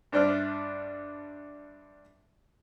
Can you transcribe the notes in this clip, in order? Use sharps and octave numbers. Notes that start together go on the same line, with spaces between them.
G2 D4 C5 D5 E5 F6